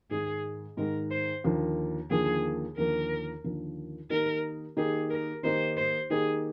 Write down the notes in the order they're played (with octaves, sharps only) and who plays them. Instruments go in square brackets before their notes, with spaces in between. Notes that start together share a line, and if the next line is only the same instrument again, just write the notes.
[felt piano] G#2 D#3 G#3 [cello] G#4
[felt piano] G#2 D#3 G#3 [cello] A#4
[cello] C5
[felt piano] D#2 D3 F3 A#3
[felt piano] D#2 D3 F3 A#3 [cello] G#4
[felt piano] D#2 D3 F3 A#3 [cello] A#4
[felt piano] D#2 D3 F3 A#3
[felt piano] D#3 A#3 D#4 G4 [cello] A#4
[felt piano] D#3 A#3 D#4 G4 [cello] G#4
[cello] A#4
[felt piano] D#3 A#3 D#4 G4 [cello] C5
[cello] C5
[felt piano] D#3 A#3 D#4 G4 [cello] G#4